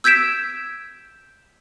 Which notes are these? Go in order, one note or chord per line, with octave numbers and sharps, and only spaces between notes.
E6 G6 G#6 B6 D7 E7